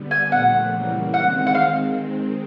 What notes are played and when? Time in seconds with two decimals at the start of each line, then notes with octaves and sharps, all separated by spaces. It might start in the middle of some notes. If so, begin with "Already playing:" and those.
Already playing: D3 G3 B3
0.11 G#5
0.32 A#2 F3 A3 F#5
0.73 C#3 E3 G3 A#3
1.13 D#3 G#3 C4 F#5
1.47 F#5
1.55 F5